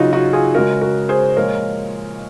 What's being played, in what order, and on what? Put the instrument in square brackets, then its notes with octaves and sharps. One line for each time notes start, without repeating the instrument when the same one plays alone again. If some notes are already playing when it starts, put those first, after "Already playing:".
Already playing: [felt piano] C#3 F#3 D#4 F4 F#4
D#4 F#4
F4 G#4
C#3 F#4 A#4
G#3
F#4 A#4
G#4 C5
A#2 F3 G#3 A#4 C#5